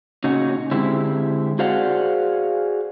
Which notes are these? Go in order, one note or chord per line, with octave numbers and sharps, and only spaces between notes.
A#2 C#3 C#4 D#4 F#4
D3 G#3 C4 E4 G4
F#4 G#4 C5 D5 F5 F#5